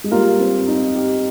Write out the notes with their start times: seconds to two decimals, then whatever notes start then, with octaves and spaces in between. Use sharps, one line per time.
0.04 G#3
0.11 G3 A#3 F4 A#4
0.39 C4
0.68 D#4
0.95 G4